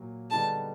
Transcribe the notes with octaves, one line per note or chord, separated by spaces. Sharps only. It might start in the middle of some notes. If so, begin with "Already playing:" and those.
Already playing: A#2 F#3 A#3
D3 G3 B3 D#4 G#4 A5